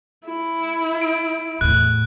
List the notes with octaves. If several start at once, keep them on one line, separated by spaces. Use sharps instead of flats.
E4
D7
E2 A2 F#6